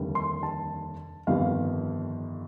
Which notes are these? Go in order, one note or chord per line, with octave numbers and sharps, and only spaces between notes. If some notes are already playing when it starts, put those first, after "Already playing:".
Already playing: F1 D#2 D3 G3
C6
A5
G1 F2 D#3 G3 F5